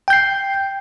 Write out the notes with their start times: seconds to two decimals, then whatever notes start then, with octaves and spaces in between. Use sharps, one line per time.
0.08 G5
0.10 G6
0.13 C7